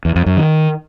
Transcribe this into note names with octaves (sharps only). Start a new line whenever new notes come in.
E2
F2
F#2
D#3